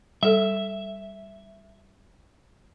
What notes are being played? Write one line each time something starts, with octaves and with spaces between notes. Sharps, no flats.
G3 A4 E5